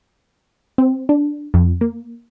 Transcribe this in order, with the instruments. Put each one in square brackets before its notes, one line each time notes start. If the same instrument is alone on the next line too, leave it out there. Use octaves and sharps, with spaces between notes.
[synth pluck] C4
D4
F2
A#3